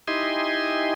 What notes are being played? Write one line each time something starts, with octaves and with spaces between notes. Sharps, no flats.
D#4 E4 G4 D#5 G#5 C6